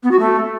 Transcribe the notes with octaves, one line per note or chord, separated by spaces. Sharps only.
B3
F#4
A3